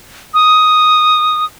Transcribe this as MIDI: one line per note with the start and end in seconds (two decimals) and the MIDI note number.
0.34 1.45 87